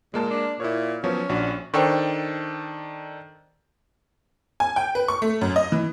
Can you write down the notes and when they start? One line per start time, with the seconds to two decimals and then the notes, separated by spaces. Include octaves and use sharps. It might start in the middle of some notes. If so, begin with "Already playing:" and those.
0.14 A#2 G#3 A#3 A5
0.30 D4
0.60 A#2 E4 C#5
1.04 F3 F#3 B3 C#4
1.29 A#1 D4 F#4
1.74 D#3 D4 A4 C5 G5 C#6
4.60 G#5
4.76 G5
4.95 B4
5.08 C#6
5.22 A3
5.41 F#2
5.56 D#5
5.72 E3